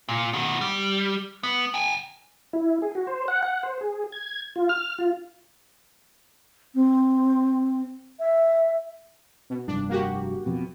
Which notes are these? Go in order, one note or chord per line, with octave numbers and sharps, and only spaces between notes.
A#2
B2 D#3
G3
B3
G5 G#5
E4
G#4
F#4
C5
F#5
F#5
C5
G#4
G#6
F4
F6
F4
C4
E5
B2
F1 G2 D4
A#3 F#4 G4
F2 B2